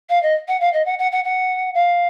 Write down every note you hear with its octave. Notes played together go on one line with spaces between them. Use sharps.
F5
D#5
F#5
F5
D#5
F#5
F#5
F#5
F#5
F5